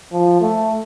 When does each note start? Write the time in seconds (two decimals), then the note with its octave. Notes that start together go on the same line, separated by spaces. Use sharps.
0.12 F3
0.41 A3